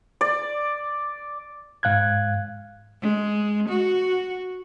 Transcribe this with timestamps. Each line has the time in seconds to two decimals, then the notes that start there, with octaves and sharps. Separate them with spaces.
0.21 D5
1.83 G#2 F5 F#6 G#6
3.01 G#3
3.69 F#4